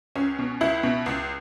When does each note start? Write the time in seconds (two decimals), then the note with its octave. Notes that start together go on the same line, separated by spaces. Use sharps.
0.15 C#2 C#4
0.39 B2
0.61 C#2 E4
0.83 B2
1.06 C#2